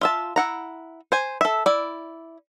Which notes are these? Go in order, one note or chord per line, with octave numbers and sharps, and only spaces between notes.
F4 E5 A5
E4 F#5 A#5
C5 G#5
A4 E5
E4 D5